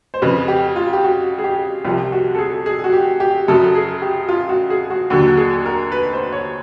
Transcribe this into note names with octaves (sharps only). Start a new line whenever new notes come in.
C5
F2 C#3 F3 B4
G4
F4
G4
F#4
G#4
G4
C2 C3 F3
F#4
A4
G#4
G#4
F#4
G4
G4
F#2 C#3 F#3 A4
G#4
G4
F4
F#4
G#4
F#4
D#2 D3 F#3 F#4
G#4
A#4
B4
C5
C#5